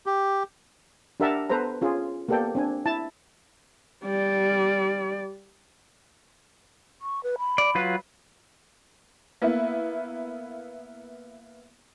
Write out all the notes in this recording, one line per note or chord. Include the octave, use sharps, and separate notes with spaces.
G4
D4 G4 A#4 E5 F#5 A5
B3 A4 B4 C5 A#5
C#4 F4 G#4
A#3 B3 G4 A4 D5 G5
C4 D4 G#5
E4 A5
G3 D5
C#6
B4
B5
D5
F#3 F4 B4
A#3 B3 E4